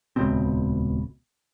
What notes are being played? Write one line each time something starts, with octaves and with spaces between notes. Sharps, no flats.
D#1 C#2 B2 C4